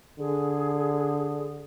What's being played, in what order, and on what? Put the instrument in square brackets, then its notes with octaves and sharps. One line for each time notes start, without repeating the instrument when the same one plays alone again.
[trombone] D3 [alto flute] G#4